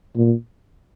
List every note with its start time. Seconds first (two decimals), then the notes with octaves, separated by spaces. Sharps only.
0.16 A#2